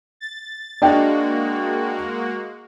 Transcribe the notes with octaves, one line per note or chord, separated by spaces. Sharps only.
A6
G#3 A#3 D4 F#4 D#5 G5